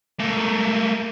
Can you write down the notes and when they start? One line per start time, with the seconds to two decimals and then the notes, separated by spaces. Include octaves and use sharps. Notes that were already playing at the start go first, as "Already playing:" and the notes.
0.19 A3 A#3